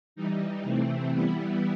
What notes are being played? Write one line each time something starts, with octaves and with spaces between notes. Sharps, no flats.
E3 G3 D#4
C3 E3 A3 C4
E3 G3 B3 E4